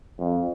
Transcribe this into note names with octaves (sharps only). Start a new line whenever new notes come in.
F2